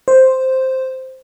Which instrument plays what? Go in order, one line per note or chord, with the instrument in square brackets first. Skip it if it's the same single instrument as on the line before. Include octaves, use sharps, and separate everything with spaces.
[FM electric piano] C5